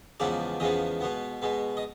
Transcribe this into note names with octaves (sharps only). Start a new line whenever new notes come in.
E2 C#3 F3 G#3 B3 D5
E2 C#3 F3 G#3 B3 D#5
B2 G#3 B3
B2 G#3 B3
D#5